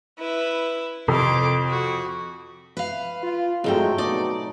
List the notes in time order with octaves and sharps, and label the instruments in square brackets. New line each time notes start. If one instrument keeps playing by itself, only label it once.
[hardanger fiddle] E4 B4
[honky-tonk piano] F2 [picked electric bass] C3 [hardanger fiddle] C6 D6
[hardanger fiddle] F#4
[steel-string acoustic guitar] B4 F5
[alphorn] F4
[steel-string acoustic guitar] F2 G#2 G5 [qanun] F#3 A3 [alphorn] G#3
[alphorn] B2 [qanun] D#4 [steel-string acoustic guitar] D5